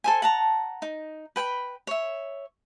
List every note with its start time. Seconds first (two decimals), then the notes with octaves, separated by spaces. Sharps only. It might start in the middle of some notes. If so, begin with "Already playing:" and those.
0.04 A4 C5 G#5
0.22 F#5 A5 A#5
0.82 D#4
1.36 B4 G5 G#5 B5
1.87 C#5 E5